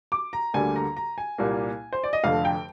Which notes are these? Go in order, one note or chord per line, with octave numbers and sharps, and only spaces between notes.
D6
A#5
D2 D3 G3 A#3 G#5
A#5
A#5
G#5
C2 A#2 G3 A#3
C5
D5
D#5
F1 F2 D3 F3 F5
G5